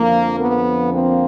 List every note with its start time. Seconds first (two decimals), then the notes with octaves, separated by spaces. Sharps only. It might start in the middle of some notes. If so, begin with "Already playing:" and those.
Already playing: F2 D3 F3 A#3
0.39 B3
0.92 A#3 C4